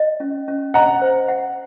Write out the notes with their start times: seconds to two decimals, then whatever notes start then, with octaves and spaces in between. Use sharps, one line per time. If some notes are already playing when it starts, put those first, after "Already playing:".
Already playing: D#5
0.20 C#4
0.48 C#4
0.74 D#5 F#5 A#5
1.02 C5
1.28 F#5